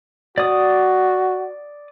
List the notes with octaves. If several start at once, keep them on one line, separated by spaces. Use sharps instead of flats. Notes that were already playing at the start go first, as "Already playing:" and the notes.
F#4 D5 D#6